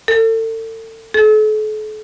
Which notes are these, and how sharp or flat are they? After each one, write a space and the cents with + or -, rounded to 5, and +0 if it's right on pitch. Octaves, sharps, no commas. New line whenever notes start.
A4 +35
A4 -40